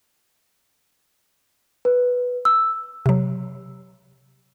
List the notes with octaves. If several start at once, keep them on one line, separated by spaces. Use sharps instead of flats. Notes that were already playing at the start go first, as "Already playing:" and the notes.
B4
E6
C3 F#3